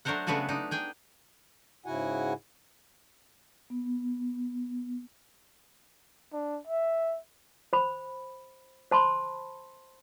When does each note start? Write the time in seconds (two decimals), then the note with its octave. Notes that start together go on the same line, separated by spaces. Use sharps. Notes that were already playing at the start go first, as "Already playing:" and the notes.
0.05 F#3 A3 D4 A#4 C5 F#5
0.27 C#3 A3 B3 D4 F#4 G#5
0.49 D4 D#4
0.71 G#4 G5 G#5
1.86 G#2 C#3 E4 F#4 F#5 G#5
3.70 B3
6.33 D4
6.67 E5
7.73 C5 B5
8.91 C5 A5 B5 C6